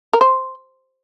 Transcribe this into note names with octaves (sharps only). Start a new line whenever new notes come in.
A#4
C5